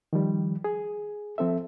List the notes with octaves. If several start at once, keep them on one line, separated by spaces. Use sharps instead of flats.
D#3 F3 G3
G#4
F3 C4 A4 E5